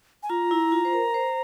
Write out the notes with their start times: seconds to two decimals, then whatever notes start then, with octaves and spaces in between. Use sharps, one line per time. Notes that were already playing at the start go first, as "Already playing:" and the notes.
0.23 G#5
0.30 F4 A#5
0.51 E4
0.72 F4
0.85 C5
0.93 A#4
1.14 C5